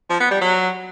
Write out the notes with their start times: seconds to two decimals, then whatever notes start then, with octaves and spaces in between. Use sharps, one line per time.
0.10 F3
0.20 B3
0.31 G3
0.41 F#3